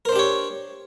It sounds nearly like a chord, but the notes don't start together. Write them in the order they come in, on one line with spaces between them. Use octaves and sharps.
A#4 C5 D4 G4 C#5